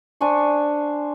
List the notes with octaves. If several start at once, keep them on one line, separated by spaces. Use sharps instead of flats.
D4 C5 G#5 C#6